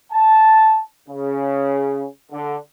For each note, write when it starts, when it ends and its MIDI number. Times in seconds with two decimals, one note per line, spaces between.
0.11 0.81 81
1.09 2.06 49
2.32 2.57 50